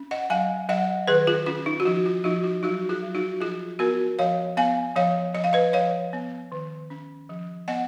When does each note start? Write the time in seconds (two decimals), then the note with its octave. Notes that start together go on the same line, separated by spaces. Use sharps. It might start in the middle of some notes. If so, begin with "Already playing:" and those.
Already playing: C#4
0.11 D#5 F#5
0.30 F#3 F5 G#5
0.69 F#3 D#5 F#5
1.07 D#3 G#4 B4
1.27 F4 G#4
1.46 C#4 F4
1.66 D#4
1.80 F#4
1.85 F3 F4
2.06 F4
2.24 F3 D#4 F#4
2.44 F4
2.63 F#3 D#4 F#4
2.89 F4 G#4
3.02 F#3
3.14 D#4 F#4
3.41 F3 F4 G#4
3.79 B3 F#4 A#4
4.19 F3 C#5 F5
4.57 B3 F5 G#5
4.96 F3 C#5 F5
5.34 F3 D#5
5.44 F5
5.53 B4 D#5
5.73 F3 C#5 F5
6.13 B3
6.52 D#3
6.90 C#4
7.29 F3
7.68 B3 D#5 F#5